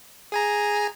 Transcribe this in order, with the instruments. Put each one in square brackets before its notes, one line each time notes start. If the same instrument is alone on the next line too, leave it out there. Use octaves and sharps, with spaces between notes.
[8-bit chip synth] G#4 G#5 A#5